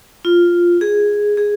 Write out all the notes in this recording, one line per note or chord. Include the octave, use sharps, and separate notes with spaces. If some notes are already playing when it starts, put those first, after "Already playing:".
F4
G#4
G#4